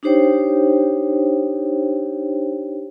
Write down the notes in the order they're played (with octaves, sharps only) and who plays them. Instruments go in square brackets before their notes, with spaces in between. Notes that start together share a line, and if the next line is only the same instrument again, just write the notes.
[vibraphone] D4 D#4 G4 C5 C#5 G5